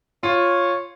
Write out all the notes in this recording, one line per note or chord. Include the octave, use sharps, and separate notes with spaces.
F4 C#5